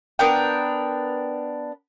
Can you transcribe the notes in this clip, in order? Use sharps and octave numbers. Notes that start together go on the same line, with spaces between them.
B3 D4 A#4 G5